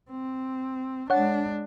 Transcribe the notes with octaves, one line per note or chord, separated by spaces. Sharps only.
C4
G#3 D4 C#5 F#5